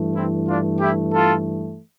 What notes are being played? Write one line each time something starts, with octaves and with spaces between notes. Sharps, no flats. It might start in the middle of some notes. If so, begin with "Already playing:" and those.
Already playing: G2 E3 A3
C4 E4
D4 F4
E4 G4
F4 A4